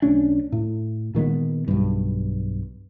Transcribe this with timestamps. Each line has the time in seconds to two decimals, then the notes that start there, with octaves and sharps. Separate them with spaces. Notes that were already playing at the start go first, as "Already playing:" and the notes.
0.02 B1 A3 C#4 D4
0.52 A2
1.15 A#2 D#3 G#3 B3
1.68 B1 G2